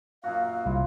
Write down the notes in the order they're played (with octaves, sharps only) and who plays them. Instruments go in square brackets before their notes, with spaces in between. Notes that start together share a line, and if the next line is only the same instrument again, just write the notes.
[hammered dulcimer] F#2 A#2 F#4 [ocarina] F5
[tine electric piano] C2 [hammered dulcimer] E4 F4